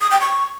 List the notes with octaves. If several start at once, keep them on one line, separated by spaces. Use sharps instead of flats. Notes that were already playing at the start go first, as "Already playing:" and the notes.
D#6
G5
C#6